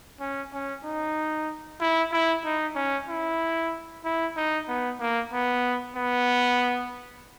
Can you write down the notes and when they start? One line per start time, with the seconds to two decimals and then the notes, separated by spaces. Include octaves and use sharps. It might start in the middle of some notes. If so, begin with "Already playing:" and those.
0.20 C#4
0.52 C#4
0.84 D#4
1.80 E4
2.12 E4
2.44 D#4
2.75 C#4
3.08 E4
4.04 E4
4.36 D#4
4.68 B3
5.00 A#3
5.33 B3
5.96 B3